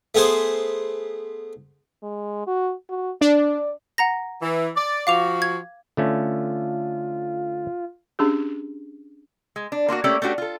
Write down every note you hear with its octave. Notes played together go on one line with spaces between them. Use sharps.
A3 B3 G#4 C5
G#3
F#4
F#4
D4 D5
F#5 A#5 A#6
E3
D5
F3 F#4 F5 D6 F7
G#6
D3 A3 C#4 F4
C#4 D4 G4 G#4
G#3
D4
A#3 D4 F4 F#4
A3 A#3 C#4 G4 D5
A3 C#4 D4 F#4 G4
F4 A4